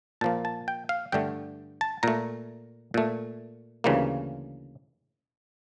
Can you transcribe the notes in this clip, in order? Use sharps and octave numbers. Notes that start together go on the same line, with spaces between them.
A#2 F3 A#3 A5
A5
G5
F5
G2 D3 A3 G5
A5
A#2 A3 A#5
A#2 A3
D2 C#3 E3 G3 A#3